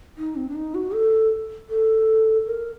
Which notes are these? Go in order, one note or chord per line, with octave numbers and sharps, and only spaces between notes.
D#4
C4
D4
D#4
F#4
A4
A4
A#4